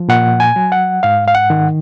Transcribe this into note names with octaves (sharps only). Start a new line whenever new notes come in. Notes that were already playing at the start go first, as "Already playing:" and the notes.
Already playing: F3
A#2 F#5
G#5
F#3
F#5
G#2 F5
F5
F#5
D#3